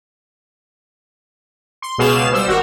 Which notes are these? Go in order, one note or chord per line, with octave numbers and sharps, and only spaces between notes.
C6
C#2 B2 G#4 F5 C7 E7
G3 C5 E6
G#1 F#4 A#4